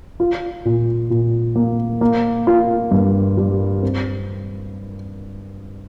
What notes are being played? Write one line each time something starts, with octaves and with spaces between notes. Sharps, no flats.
F4
A#2
A#2
A#3
A#3
F4
G2
G3
C4